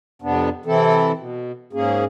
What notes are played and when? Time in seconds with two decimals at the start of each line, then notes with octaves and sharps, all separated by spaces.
0.22 F2 C3 B3 D4
0.66 C3 E3 C4 E4 A4
1.16 B2
1.73 G#2 A#3 C#4 G#4